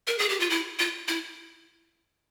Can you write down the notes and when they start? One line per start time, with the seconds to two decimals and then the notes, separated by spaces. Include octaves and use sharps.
0.07 A#4
0.19 G#4
0.29 G4
0.40 F4
0.50 E4
0.79 F4
1.08 E4